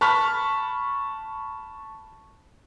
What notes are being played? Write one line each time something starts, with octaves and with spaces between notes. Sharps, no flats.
A5 B5 C#6 F6 B6